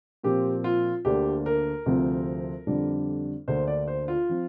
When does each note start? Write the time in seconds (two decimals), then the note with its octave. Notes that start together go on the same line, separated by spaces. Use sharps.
0.23 A#2 F3 C4 G4
0.64 F4
1.05 D2 D3 A#3 D4 G4
1.46 A#4
1.86 D2 C3 F3 C4
2.67 F2 D3 G3 D4
3.48 D2 D3 A#3 D4 C5
3.67 D5
3.88 C5
4.08 F4
4.29 F3 C4